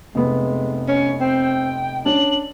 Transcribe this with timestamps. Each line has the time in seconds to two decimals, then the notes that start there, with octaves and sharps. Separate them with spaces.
0.15 F1 G#3 B3
0.88 C#4
1.20 C4 G5
2.06 C#4 D4 F#7